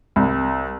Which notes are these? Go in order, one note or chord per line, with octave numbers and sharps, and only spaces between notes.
C2